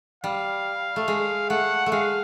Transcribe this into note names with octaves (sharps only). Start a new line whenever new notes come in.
G3 F5
A3
G#3
A3 F#5
A3
G#3 F5